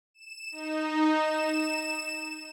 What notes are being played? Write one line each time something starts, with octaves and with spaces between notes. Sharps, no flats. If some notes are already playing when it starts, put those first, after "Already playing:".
E7
D#4
E7